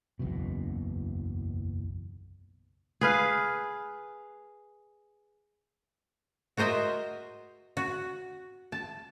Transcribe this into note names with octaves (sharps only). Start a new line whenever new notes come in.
F#1 B1 E2 B2
G#4 B4 F5
F#4 A#4 C5 D#5 E5
F#4
A5